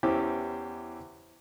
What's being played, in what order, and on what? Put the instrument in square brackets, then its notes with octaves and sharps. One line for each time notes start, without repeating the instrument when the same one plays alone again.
[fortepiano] E2 E3 C#4 G4 C5 D6